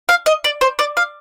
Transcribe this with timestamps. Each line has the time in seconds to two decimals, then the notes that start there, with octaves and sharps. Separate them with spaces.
0.09 F5
0.26 D#5
0.44 D5
0.61 C5
0.79 D5
0.97 F5